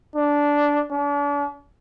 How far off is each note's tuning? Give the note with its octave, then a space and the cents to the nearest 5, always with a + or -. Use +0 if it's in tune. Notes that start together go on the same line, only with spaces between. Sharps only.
D4 -10
D4 -40